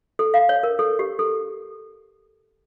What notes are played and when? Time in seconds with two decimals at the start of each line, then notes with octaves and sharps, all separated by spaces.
0.19 A4
0.34 F5
0.49 C#5
0.63 A#4
0.79 A4
0.99 G4
1.19 A4